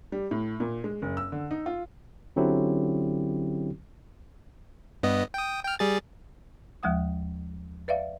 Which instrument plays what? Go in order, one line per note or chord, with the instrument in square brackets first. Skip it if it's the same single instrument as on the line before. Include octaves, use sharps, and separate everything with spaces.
[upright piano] G3
A2
A#2
G#3
F#1
E6
D3
D#4
F4
[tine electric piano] D3 F#3 C4 C#4 E4 G4
[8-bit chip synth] G2 B3 D#5
G5 D#6
G5 F6
G3 G#4 A6
[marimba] D#2 F3 G#3 F#5 D#6
B4 D5 E5 F5